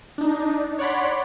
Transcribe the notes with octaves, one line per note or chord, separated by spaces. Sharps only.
D4 D#4
C#5 D5 F#5 B5 C6